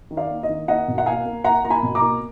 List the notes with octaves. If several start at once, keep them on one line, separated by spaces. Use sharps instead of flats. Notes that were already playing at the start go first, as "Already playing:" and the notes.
D#3
D5 F5
A#3
D#5
D#3
A#3 D#5 F#5
B2
F#5
A#3 F5 G#5
A#3
A#3 F#5 A#5
A#3 A#5
G#5 B5
B2
A#5 D6
A#3